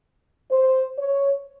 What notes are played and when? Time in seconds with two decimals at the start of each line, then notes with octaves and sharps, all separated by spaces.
0.51 C5
0.99 C#5